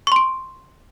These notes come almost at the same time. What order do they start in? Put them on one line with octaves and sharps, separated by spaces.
C#6 C6 D7